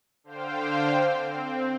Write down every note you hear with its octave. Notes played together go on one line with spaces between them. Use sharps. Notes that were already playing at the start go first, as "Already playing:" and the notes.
D3 C5 F5 G5
C4